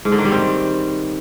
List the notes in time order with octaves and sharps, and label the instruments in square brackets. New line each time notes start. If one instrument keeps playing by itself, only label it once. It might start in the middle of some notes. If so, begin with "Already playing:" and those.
[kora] G#2
D3
D#3
G3
C4